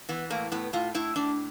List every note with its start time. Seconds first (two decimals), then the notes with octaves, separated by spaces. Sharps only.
0.09 E3 B3
0.30 A2 A#3
0.52 A2 B3
0.73 A2 F4
0.95 A2 E4
1.16 A2 D4